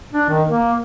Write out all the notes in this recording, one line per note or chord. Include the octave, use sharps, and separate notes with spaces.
D4
D#3
A#3